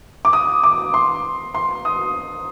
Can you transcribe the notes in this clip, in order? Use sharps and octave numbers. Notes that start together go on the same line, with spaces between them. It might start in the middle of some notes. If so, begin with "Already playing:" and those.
D6
D#6
D6
C6
C6
D#6